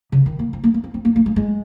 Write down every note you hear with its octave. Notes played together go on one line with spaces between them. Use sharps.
C#3
D#3
A#3
C4
A#3
A#3
C4
C4
A#3
A#3
G#3
G#3